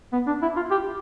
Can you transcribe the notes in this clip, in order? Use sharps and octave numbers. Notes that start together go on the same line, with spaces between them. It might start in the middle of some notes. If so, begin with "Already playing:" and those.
B3
D4
E4
F4
G4